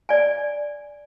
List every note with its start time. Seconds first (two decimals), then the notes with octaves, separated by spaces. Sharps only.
0.09 D5 G#5